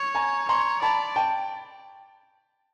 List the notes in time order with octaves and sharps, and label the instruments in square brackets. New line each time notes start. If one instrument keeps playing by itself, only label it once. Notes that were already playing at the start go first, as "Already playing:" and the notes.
Already playing: [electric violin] C#5
[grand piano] G#5 A#5
[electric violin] C#5 [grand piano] A#5 C6
[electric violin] D5 [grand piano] A5 B5
[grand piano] G5 A5